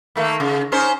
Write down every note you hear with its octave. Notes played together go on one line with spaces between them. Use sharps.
D#3 A3 A#3
C#3
C#4 D#4 C5